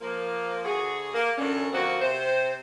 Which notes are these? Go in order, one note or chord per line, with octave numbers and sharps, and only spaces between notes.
F3 A#3
D2 F#4 G#4
A#3
F#2 D3 E3 C#4 D4
D2 F3 A#3 C4 F#4
C3 C5